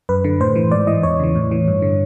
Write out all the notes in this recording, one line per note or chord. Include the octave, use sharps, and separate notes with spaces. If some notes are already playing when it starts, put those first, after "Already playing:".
F#2 B4
D3
A2 C5
E3
G#2 D5
E3 D#5
E2 C#5
C#3 E3
A2
E3
G2
D3